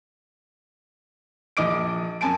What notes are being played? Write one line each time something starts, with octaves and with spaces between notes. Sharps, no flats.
A#1 D#5 D6 D7
F#2 G#5 A5 D7